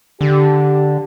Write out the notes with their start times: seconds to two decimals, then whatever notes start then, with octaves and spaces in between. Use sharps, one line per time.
0.21 D3 G4